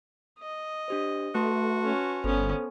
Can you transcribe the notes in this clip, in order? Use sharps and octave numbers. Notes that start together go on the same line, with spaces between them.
D#5
D4 G4 C5
A3 F#4 B4 A5 C6
C#4
G1 B3 C#4 A4 C5